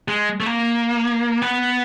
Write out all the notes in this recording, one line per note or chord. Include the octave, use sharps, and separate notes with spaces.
G#3
A3
A#3
B3